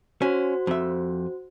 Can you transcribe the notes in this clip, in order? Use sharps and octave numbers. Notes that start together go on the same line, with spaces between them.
C#4 F#4 C5
F2 E5